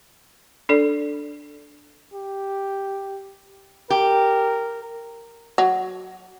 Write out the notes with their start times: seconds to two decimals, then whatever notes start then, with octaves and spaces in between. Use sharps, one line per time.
0.69 D4 A4 D5
2.14 G4
3.90 G4 A#4
5.58 F#3